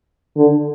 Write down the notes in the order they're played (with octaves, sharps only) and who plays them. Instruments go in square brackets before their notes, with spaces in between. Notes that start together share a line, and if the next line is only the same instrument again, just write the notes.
[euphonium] D3